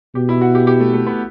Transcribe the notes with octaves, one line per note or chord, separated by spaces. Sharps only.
B2 G4
E4
F#4
G4
G4
A3
A3
B3